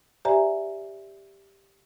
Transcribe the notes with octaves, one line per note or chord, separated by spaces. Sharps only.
G4 C5 D5 E5 G#5 A#5